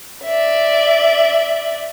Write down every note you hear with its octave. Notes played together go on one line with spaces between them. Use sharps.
D5 E5